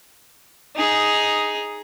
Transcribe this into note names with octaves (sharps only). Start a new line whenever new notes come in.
D#4 G#4